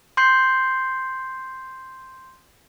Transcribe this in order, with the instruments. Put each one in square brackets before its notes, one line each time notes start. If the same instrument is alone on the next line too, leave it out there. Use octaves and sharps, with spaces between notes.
[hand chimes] C6 G6 C7